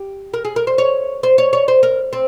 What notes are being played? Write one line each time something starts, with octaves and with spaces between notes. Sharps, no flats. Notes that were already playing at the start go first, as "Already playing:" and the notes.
Already playing: G4
A#4
G#4
A#4
C5
C#5
C5
C#5
C#5
C5
A#4
C4